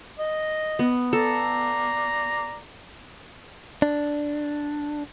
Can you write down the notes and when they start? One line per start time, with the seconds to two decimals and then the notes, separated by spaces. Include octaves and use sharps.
0.20 D#5
0.79 B3
1.13 A4 D5 A#5
3.82 D4